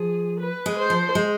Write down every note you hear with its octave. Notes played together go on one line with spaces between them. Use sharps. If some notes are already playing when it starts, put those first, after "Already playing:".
Already playing: F3 G#4
B4
G#3
C5
F3
G#3